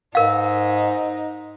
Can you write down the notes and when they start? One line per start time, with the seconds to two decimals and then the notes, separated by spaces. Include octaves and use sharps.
0.15 G#2 D#4 A#4 F5